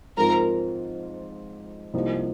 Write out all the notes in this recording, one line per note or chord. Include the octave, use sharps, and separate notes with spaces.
G#2 F3 C4 F4 A#4 A#5
C2 C3 F3 A#3 D#4